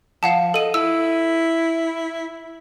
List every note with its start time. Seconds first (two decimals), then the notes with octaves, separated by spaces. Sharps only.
0.23 F3 F5 F#5 A5
0.54 A4 D#5 D#7
0.74 E4 E6